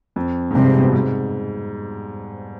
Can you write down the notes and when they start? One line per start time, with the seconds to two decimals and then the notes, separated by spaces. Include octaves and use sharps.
0.16 F2
0.51 G#2
0.55 G2 C3
0.67 G#2
0.80 B2
0.93 G#2